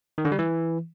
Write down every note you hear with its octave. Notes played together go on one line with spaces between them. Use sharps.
D#3
D3
G3
E3